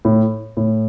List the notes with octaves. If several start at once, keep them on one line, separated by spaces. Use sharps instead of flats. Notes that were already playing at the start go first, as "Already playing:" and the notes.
A2
A2